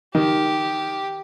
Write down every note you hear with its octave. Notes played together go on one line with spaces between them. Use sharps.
D#3 G4